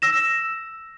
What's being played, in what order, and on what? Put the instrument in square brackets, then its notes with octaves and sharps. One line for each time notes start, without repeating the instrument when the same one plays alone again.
[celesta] E6 A#6 E7